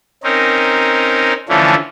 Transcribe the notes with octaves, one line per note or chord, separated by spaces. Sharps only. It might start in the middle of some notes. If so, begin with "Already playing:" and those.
C4 C#4 D#4 A#4
D3 E3 F3 A3 C#4